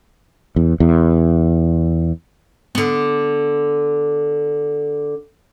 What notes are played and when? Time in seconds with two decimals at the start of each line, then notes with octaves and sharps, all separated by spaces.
0.56 E2
0.80 E2
2.75 D3 B3